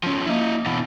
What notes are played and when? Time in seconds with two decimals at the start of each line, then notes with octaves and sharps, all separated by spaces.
0.03 F3 C#4
0.27 A#3 E4 D#5
0.66 B2 E3